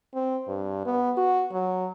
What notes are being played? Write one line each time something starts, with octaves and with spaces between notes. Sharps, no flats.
C4
G2
B3
F#4
F#3